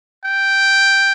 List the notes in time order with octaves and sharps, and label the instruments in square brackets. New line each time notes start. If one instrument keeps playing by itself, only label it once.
[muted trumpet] G5